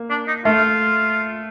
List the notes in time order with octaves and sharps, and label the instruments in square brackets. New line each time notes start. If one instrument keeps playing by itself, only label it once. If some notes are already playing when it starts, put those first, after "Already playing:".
Already playing: [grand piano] A#3
[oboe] D4
D#4
[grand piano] A3 [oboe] F4